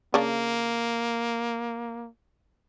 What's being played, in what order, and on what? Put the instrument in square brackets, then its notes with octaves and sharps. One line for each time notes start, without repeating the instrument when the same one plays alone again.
[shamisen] C#3 D4 [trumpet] A#3